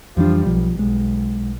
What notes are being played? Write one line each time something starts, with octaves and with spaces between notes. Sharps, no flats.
F2 E3 F3 G3 D4
B1 F3
B1 G#3